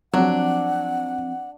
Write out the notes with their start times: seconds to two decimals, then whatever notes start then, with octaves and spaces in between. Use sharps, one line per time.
0.14 F3 F#3 C4 D4 F#5